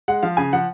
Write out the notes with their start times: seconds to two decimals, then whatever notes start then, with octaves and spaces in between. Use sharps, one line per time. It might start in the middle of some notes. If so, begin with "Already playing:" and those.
0.08 G#3 F#5
0.23 F3 F5
0.37 C#3 G#5
0.53 F3 F#5